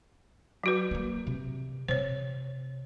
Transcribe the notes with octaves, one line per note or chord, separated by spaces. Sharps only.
F#3 F#4 B4
A#3 B3
C3
C3 C5 C#5